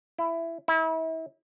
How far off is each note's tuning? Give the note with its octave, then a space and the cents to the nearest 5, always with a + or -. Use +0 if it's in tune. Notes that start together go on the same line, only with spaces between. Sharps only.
E4 +15
E4 -35